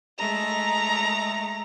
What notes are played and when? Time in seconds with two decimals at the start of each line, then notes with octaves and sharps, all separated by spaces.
0.19 G#3 A3 A#5